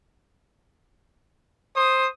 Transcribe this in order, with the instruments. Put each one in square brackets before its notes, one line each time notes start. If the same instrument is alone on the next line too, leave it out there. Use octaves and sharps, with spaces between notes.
[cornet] C5 [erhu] D#6